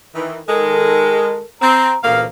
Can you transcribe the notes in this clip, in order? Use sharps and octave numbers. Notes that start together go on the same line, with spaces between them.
D#3 E3
D#3 G#3 A4 A#4
C4 A#5
D2 A#2 C#3 E3 A#3 F5